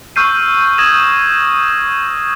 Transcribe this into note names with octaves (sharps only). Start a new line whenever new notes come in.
C#6 E6 F6 G6 C7 D#7
D#6 G#6 A#6 E7 F#7